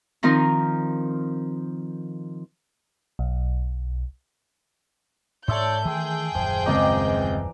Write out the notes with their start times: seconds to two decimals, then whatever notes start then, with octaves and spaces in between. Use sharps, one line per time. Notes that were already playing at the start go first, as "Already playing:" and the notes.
0.23 D#3 F3 C4 D#4 F4 A#4
3.19 B1
5.48 G#2 A4 C#5 D5 E5 C6 G6
5.85 D#3 E3 A3 G#4 G5 G6
6.35 D#1 F#2 F3
6.66 C#2 C4 D5 D#5 A#5 D6
7.07 E3